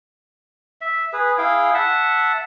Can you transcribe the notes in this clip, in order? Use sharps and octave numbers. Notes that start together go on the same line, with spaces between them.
E5
G#4 B4
E4 G#4 F5 G5
E5 F#5 A5